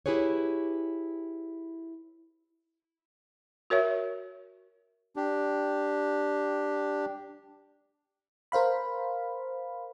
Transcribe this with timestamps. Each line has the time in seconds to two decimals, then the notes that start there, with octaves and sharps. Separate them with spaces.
0.06 E4 G4 G#4 B4 C#5
3.70 F#4 A#4 C#5 E5
5.16 D4 G4
8.52 A#4 C5 F5 B5